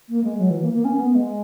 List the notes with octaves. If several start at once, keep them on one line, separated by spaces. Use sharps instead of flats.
A#3
G#3
F#3
E3
A#3
A#3
C#4
A#3
B3
G#3